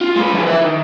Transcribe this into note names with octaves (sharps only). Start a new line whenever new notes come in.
F4
G#3 B4
F3 E4
B4 E5
D#3